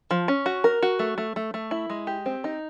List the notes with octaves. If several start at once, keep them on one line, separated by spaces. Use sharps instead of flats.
F3
C#4
F#4
A#4
F#4
A3
A3
A3
A3
E4
G#3
G4
C4
D#4